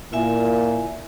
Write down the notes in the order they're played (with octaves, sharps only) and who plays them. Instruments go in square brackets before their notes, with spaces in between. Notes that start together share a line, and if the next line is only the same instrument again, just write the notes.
[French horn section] A#2 [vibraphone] E4 E5 G#5